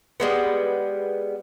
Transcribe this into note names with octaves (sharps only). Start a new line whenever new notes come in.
G3 G#3 B3